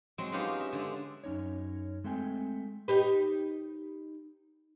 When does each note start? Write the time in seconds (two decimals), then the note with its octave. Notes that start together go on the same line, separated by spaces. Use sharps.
0.18 F#3 G#3 C4
0.32 B3 C#4 D#4 F4 G4 C5
0.60 E5
0.73 D3 G#3
1.24 F#2 C#4 D#4 C#5
2.04 G#3 A3 C4 G5 G#5
2.88 D#4 G4 B4